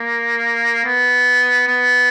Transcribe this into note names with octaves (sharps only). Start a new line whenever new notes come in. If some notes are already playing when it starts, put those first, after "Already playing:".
Already playing: A#3
B3
B3